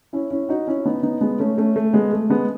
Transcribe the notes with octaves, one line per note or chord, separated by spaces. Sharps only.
C#4 E4
C#4 E4
D#4 F#4
C#4 E4
B3 D#4
B3 D#4
G#3 B3
A3 C#4
A3 C#4
A3
G#3 B3
A3
G#3 B3